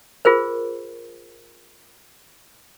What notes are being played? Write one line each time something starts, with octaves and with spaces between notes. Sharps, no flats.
F4 G#4 A#4 C5